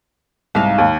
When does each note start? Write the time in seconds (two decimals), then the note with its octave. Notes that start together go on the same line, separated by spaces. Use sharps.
0.55 C2 G#2 D#4 F5
0.78 D#2